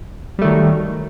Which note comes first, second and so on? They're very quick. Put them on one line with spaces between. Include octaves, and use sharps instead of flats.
G3 A3 D#3 F#3